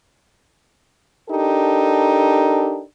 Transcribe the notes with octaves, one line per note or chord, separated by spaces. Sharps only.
D4 D#4 G4 A4 A#4